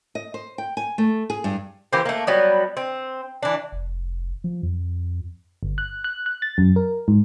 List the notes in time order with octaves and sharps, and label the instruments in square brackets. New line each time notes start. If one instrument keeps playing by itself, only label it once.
[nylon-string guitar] D#5
C5
G5
G#5
A3
G#4
G2
[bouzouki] E3 A#3 G4 C5
A3 A#3
F#3 G3 B3
C4
E3 D4
[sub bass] F1
F3
F2
[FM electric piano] G1
F#6
F#6
F#6
A6
F#2
A#4
G#2